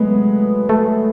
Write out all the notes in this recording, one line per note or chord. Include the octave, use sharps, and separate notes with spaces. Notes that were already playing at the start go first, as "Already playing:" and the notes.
Already playing: F#3 G#3 A3 B3
A3